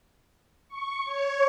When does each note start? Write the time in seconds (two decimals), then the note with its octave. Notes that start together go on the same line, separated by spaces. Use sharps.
0.68 C#6
1.04 C#5